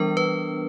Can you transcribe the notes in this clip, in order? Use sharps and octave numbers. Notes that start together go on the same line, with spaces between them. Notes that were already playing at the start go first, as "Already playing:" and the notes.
Already playing: E3 G3 B3 D4 A#4
B4